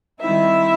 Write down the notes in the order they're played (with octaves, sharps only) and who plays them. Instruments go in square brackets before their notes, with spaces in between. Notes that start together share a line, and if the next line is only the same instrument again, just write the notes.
[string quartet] D#3 G3 C4 D#4 E4 E5